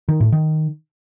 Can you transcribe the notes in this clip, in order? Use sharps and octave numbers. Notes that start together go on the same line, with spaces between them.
D#3
A2
D#3